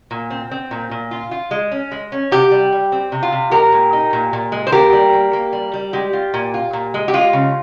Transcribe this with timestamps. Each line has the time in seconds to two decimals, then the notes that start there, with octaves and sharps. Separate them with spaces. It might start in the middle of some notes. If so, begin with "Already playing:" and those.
0.11 A#2
0.30 C4
0.51 C4
0.71 A#2
0.91 A#2
1.11 F4
1.31 F4
1.51 G#3
1.72 C#4
1.91 G#3
2.12 C#4
2.31 C3 G4
2.51 G3
2.72 G3
2.92 C4
3.12 C3
3.23 F4
3.32 C3
3.51 G#3 G4 A#4
3.72 A#2
3.93 D#4
4.13 A#2
4.33 A#2
4.52 G#3
4.67 C5
4.72 A#3 G4 A#4
4.93 G3
5.13 A#3
5.33 A#3
5.53 G3
5.74 G3
5.93 G#3 G4
6.13 F4
6.34 A#2
6.54 F4
6.73 A#2
6.94 G#3
7.08 G4
7.13 G#3 F4
7.33 C#3